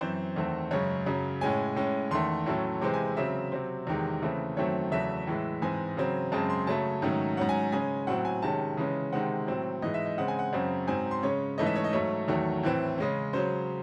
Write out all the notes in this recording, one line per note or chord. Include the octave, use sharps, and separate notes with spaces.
F#2 E3 C4 C5
E2 D#3 A3 C4
F#2 C#3 G#3 C#5
F#2 C#3 F#3 C#4
A2 G#3 C#4 G#5
A2 G#3 C#4
E2 D#3 A3 C6
A2 F#3 A3 C#4
C3 E3 G#3 C4 C6
G#5
C#3 F#3 C4 E5
C3 F#3 C4
E2 C3 D#3 G#3
C#3 E3 A3 C4
F#2 D#3 F#3 A3 C4 C#5
E2 C#3 F#3 A3 E5
A2 E3 G#3
G#2 E3 G#3 C4 G#5
C#3 F#3 C4
F#2 C#3 G#3 C4 A5
C6
C#3 F#3 A3 C#4 A5
G#2 D#3 F#3 A3 C#4
G#2 F#3 C#4 F#5
G#5
C#3 G#3 C#4 G#5
A2 F#3 C4 F#5
G#5
C3 D#3 G#3 C#4 A5
C#3 E3 G#3 C#4
C3 D#3 G#3 C4 F#5
A2 F#3 C4
G#2 E3 G#3 D#5
E5
D#5
C#3 G#3 C4 F#5
G#5
F#5
F#2 C#3 F#3 C4
G#2 F#3 C4 G#5
C6
C#3 G#3 C#4 C#5
G#2 E3 A3 C#4 D#5
E5
C#5
D#5
G#2 F#3 A3 C#5
E2 D#3 F#3 A3
A2 E3 C4
C#3 G#3 C#4
C#3 F#3 C#4 C5